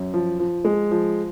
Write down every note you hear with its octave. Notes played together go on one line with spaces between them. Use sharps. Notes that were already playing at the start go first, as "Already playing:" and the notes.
Already playing: F#2
F3
F3
G#3
F3